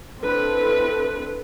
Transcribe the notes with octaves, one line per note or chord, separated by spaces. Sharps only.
C4 D4 E4 A4 B4